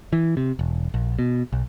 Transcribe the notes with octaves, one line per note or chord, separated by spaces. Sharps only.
E3
C3
E1
A#1
B2
B1